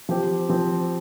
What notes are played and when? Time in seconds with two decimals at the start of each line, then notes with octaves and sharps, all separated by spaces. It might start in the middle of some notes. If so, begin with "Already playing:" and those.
0.09 F3 C4 G4
0.49 F3 C4 G4